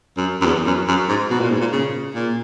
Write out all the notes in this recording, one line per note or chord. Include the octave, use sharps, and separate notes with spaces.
F#2
F#2
E2
F#2
F#2
G#2
B2
A#2
G#2
A#2
C#3
A#2